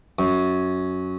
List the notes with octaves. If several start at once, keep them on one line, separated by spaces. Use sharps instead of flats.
F#2